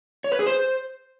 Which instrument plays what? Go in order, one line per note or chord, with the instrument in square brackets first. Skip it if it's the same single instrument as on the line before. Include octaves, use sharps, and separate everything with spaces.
[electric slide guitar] C#5
B4
G#4
C5